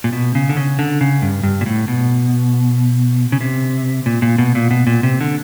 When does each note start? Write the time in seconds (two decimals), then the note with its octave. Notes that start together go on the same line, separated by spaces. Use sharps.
0.04 A#2
0.13 B2
0.35 C#3
0.49 D3
0.57 C#3
0.79 D3
1.01 C#3
1.22 G2
1.43 G2
1.61 A#2
1.66 A2
1.88 B2
3.32 C#3
3.41 C3
4.06 A#2
4.22 A#2
4.38 B2
4.55 A#2
4.71 B2
4.87 A#2
5.03 C3
5.21 D3